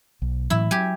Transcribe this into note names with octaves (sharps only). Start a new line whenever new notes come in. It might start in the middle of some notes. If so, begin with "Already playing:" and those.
B1
A2 E3 F#3 E4
F#3 G4 G#5